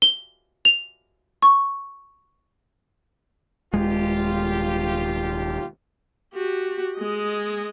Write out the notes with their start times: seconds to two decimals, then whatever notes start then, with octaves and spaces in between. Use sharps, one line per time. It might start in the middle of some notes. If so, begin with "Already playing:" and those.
0.02 G7
0.65 F7
1.42 C#6
3.74 D#1 G#3 F4 G4
6.34 F#4 G4
6.97 G#3 D#5